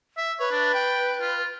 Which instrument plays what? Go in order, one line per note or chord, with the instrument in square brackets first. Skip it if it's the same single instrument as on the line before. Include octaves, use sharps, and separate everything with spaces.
[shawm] E5
[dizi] B4 [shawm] C#5
[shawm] D4
G5
F4